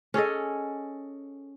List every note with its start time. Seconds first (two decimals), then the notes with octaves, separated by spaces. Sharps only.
0.14 C#4 G#4 A4 D#5